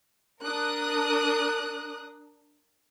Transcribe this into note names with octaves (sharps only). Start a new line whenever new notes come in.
D4 A#4 D#6 F#6